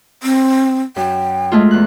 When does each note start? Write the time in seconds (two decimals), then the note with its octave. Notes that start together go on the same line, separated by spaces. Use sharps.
0.23 C4
0.96 F#2 G5
1.52 G#3 A3 F4
1.71 E2 F#6